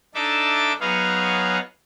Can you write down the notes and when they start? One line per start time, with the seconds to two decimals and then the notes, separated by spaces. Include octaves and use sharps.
0.15 D4 D#4 A4 E5 D6
0.81 F#3 B3 D#4 G#4 C#5 F5